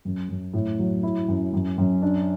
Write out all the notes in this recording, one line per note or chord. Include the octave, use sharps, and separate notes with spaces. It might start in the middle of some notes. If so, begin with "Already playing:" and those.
F#2
F#2
A2
F#3
E4
F#2
F#2
F#2
D4